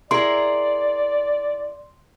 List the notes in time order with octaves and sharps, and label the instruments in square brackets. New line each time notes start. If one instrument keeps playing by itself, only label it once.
[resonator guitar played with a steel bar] E4 G#4 A#4 [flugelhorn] D5 [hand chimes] C6